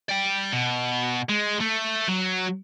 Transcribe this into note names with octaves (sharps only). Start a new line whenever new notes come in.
D5 G5
B2
G#3
A3
F#3